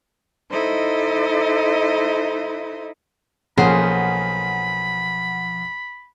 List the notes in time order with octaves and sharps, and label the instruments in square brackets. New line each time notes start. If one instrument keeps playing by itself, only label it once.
[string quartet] D#4 E4 A4 C5 D#5
[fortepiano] B1 A#3 C#4 [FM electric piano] F3 F#5 [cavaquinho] G#4 C5 [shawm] B5